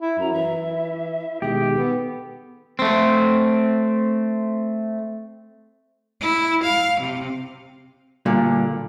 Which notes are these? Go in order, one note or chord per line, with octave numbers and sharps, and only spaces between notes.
E4
F#2 A#5
E3 E4 E5
B2 D#3 G#3 G4 G#4
B3 A4
A3 C4
E4
F5
C3
G2 A#2 D3